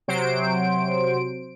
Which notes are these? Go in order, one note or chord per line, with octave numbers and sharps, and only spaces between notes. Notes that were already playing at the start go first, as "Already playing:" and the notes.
C3 F#3 C5 D7